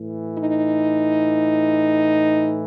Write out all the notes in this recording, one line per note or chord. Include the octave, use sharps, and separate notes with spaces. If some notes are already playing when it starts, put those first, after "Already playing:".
Already playing: A2 E3
D#4